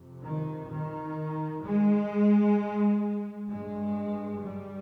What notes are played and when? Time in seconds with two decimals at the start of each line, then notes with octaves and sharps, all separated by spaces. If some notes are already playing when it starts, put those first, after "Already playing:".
Already playing: F2 C3
0.23 D#3
0.70 D#3
1.63 G#3
3.49 G2 G#3
4.41 G3